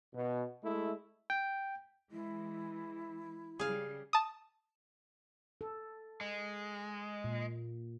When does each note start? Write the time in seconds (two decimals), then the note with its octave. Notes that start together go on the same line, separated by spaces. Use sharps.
0.15 B2
0.63 G#3 A3 E4
1.30 G5
2.11 E3 G#3 E4
3.59 C#3 G3 G#4 F5
4.13 A5 D#6
5.61 A4
6.21 G#3
7.24 A#2